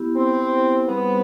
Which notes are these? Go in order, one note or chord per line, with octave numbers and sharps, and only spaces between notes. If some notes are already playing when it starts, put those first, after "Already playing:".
Already playing: B3 E4 G4
C4
G3 B3 C4 D#4 G#4 C5